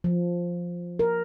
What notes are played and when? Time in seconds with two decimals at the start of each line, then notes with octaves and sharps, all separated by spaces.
0.04 F3
0.99 A#4